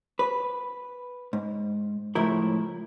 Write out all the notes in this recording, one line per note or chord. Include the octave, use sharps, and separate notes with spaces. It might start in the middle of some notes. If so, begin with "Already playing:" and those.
B4
G#2
C#2 A2 F3 E4 A#4